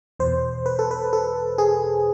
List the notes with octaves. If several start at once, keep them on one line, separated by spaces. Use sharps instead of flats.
E2 B2 C5
B4
A4
B4
A4
G#4